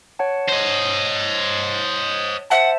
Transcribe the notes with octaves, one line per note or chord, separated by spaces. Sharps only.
C#5 F#5 A5
C5 D#5
C5 E5 F#5 A5